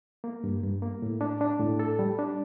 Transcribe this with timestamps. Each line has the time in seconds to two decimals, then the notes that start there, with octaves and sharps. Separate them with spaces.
0.24 A#3
0.44 G2
0.63 G2
0.82 A#3
1.02 A2
1.21 D4
1.41 D4
1.60 A2
1.79 A4
1.99 G3
2.19 D4